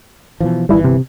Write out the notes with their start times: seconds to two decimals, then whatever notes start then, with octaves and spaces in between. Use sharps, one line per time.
0.41 B2 E3 F3
0.69 G1 B2 E3 G3 E4
0.84 C3